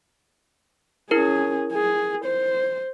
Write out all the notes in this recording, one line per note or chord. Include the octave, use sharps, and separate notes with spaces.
C#4 E4 G#4 A#4
G#4
C5